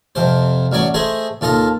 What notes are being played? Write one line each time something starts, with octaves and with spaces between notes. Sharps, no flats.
F2 C3 C5
A1 F#3 C#5 D5
A3 G#4 C5 D#5
D#2 F4 A4 D#5 F5